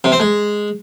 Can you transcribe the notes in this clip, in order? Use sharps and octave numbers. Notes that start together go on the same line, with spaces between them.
C3
C4
G#3